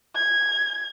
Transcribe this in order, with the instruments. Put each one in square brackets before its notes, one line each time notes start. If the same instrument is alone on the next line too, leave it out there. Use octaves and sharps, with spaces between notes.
[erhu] G#6